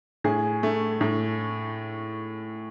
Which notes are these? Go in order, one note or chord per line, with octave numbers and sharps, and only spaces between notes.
A2 G#4
A3
A2